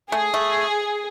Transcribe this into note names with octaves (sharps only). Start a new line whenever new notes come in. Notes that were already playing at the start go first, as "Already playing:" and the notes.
A3 G#4
A3